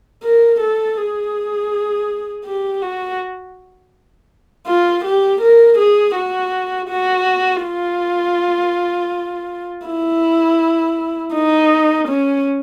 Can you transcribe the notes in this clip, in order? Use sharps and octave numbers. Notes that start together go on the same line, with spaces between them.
A#4
A4
G#4
G4
F#4
F4
G4
A#4
G#4
F#4
F#4
F4
E4
D#4
C#4